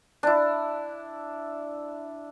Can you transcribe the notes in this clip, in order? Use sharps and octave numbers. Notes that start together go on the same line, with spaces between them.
D4 E4